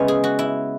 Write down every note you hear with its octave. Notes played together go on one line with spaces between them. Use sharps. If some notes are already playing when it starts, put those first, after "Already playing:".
Already playing: C#3 G#3 B3 C#5 E5
G#4
F#4
E4